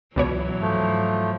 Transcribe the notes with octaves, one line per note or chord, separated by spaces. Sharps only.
C#2 B2 E3 F#3 C#5
G#2 F3 A3